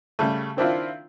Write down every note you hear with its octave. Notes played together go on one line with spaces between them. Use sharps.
C#3 G3 A3
D#3 C4 D4 E4 F4